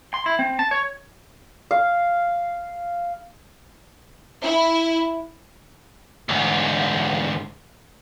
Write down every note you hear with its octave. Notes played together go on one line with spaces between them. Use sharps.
C6
E4
C4
A5
C#5
F5
E4
D2 G#2